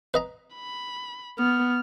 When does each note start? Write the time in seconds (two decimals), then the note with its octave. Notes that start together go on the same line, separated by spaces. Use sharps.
0.14 B4 D#5 A#5
0.55 B5
1.38 B3 F6